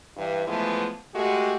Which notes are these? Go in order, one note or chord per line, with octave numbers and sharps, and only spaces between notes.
G2 E3
E3 F3 G#3 A3 B3
G#3 A3 F#4 G4